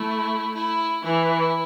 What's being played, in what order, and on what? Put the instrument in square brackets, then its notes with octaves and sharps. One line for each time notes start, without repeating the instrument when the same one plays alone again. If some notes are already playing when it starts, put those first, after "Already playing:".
Already playing: [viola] A3 [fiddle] E4
[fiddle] E4
[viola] E3 [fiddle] E4